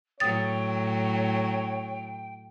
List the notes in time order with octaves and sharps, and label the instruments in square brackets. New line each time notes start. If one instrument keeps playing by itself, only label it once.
[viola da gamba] A2 F#3 [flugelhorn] C#5 [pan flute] G5 [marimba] D#6 A6